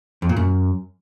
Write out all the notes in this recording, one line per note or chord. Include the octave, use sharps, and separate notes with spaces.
F2
A#2
F#2